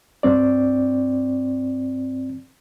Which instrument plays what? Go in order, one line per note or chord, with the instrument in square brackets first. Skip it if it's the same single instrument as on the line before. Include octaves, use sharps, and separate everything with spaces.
[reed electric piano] G2 C4 D5